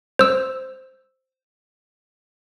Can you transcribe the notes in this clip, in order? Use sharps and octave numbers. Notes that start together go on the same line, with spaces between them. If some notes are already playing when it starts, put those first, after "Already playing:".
C5 E6